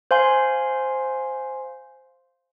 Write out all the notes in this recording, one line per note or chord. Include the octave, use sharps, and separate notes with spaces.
C5 F5 G#5 C6